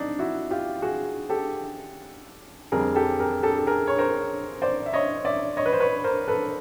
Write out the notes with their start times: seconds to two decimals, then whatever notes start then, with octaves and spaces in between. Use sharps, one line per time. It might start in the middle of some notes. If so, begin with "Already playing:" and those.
Already playing: C3 D4 D#4
0.19 E4 F#4
0.51 F4 G4
0.82 F#4 G#4
1.29 G4 A4
2.72 F2 D3 G3 G#4 A#4
2.95 G4 A4
3.20 G#4 A#4
3.43 G4 A4
3.59 A4
3.67 G#4 A#4
3.87 C#5
3.98 A#4 C5
4.62 C5 D5
4.86 E5
4.93 C#5 D#5
5.25 D5 E5
5.57 C#5 D#5
5.66 B4
5.73 C5
5.80 B4 C#5
6.04 A#4 C5
6.28 A4 B4